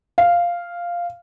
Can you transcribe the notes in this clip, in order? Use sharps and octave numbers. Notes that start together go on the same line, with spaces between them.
F5